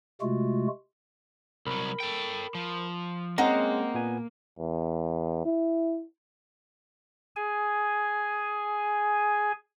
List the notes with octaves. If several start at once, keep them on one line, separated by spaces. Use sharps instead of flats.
C3 G#3 A3 F4 F#4
C2 F#3 A#4 B5
A4 G5
F3
G#3 A#3 C4 C#4 G#4 D#5 F#5 A#5
A#2 B3 G#5
E2
E4
G#4 G#5